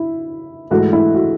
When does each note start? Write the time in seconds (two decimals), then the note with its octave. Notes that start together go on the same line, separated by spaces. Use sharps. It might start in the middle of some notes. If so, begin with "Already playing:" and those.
Already playing: E4
0.71 G#2 E3 A3 F#4
0.93 E4
1.15 F#4